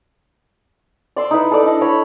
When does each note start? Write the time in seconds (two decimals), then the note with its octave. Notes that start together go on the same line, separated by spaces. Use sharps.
1.16 D5 C6 E6
1.31 D#4 E4 B4
1.51 A4 D5
1.63 D4 D#5
1.81 C#5 B5